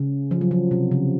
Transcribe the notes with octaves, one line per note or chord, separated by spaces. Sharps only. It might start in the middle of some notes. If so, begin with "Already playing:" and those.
Already playing: C#3
F3
F#3
F3
C3
C#3